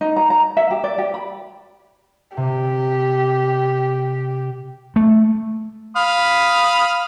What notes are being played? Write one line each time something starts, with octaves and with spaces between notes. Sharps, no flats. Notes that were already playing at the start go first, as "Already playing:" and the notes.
D#4
A#5
A#5
E5
G4
D5
G4
B5
C3 G4
A3
F5 B5 D#6